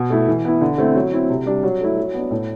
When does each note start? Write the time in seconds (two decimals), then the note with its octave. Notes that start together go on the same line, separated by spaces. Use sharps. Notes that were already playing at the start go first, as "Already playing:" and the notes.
Already playing: B2
0.10 A3 E4
0.28 E3
0.45 B3 E4
0.61 D3
0.78 A3 C4 E4
0.95 F#3
1.13 C4 E4
1.30 C3
1.46 G3 D4
1.63 F#3
1.81 A3 E4
1.97 F#3
2.14 B3
2.19 D4
2.31 A2